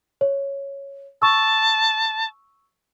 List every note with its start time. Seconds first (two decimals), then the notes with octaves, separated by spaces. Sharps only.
0.21 C#5
1.22 A5 C#6 E6